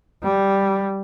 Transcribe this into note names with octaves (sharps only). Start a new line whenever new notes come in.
G3